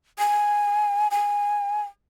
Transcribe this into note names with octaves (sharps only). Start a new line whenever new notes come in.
G#5
G#5